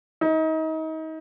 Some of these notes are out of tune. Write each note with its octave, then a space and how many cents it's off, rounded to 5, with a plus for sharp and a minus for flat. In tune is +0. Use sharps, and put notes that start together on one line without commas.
D#4 +30